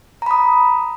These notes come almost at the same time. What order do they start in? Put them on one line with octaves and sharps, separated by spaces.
A#5 B5 D#6